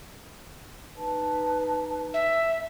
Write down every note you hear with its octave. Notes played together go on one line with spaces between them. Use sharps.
D#4 B4 A5
E5